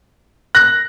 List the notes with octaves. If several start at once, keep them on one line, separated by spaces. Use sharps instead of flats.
F#6 A#6